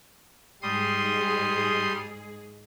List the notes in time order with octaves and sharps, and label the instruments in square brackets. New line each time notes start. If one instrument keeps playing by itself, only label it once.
[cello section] G#2 G#3 G#4 [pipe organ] G3 C6 D#6